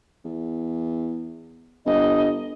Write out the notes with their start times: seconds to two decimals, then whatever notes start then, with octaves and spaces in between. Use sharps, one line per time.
0.25 E2
1.86 G1 D#5